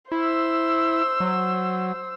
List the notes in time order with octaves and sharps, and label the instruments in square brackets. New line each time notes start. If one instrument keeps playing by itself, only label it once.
[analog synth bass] E4 [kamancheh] C5 E6
[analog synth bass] F#3